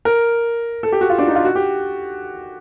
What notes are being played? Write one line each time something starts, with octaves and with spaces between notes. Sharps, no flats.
A#4
A4
G4
F#4
F4
D4
D#4
F4
F#4
G4